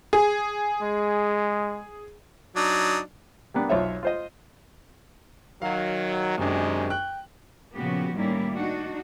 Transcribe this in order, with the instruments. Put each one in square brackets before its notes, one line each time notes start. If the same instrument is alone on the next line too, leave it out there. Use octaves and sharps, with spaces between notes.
[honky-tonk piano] G#4
[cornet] G#3
[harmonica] F#3 D4 D#4
[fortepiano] G3 A#3 B3 D4
B1 F4 C5 C#5 E5
F4 C5 D#5
[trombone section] D#3 F#3 [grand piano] F5
[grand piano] F#2 D4 [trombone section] C3 D#3 G#3
[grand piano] G5 F#6
[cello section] A#2 C#3 F3 B3 F#4 G4
A2 D#3 G3 A#3 C#4 E4
D4 D#4 F#4